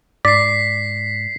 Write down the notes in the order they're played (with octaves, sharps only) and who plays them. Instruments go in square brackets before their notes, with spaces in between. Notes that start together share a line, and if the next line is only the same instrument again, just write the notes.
[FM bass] G#2 [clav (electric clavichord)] D5 [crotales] B6 C7